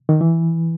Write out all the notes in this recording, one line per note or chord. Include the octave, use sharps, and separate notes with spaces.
D#3
E3